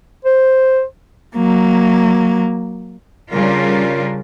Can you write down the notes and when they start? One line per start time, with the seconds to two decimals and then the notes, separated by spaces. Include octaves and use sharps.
0.25 C5
1.36 F#3 A#3
3.32 C#3 G3 D4 F4 A#4